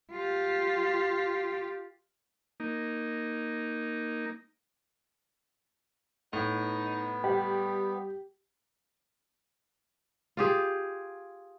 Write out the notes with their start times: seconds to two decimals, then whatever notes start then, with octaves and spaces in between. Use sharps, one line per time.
0.12 F4 G4
2.60 A#3 D#4
6.33 A2 B3 D#4
7.24 G3 G4
10.37 F4 G4 G#4